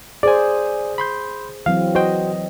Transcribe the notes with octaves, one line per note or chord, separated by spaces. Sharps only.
G#4 C5 D5 G#5
B5 C6 G6
E3 F#3 C4 F5
F#4 C5 D#5 G5